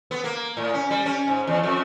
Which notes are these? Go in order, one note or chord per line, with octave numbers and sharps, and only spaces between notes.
B3
A#3
A2
C#4
G3
C#4
G#2
E2
F2